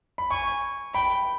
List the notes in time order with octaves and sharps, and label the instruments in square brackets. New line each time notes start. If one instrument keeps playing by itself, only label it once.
[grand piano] B5
[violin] G#5 [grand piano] C#6
[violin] G5 [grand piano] B5